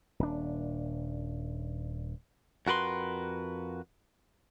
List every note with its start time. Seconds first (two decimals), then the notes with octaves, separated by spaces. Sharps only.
0.20 D#1 D4
2.67 F2 F#4 A#4 B4 C6